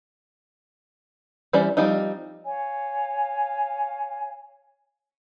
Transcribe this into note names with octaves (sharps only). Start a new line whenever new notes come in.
E3 G3 C#4 C5 D5
F3 G3 C4 D#4
C#5 F5 G#5